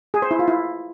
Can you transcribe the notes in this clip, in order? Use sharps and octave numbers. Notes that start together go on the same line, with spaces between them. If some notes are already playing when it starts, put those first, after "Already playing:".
G#4
C5
E4
F4
E4